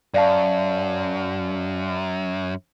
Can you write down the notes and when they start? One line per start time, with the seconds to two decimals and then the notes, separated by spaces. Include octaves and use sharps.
0.14 F#2 D5 F5 A5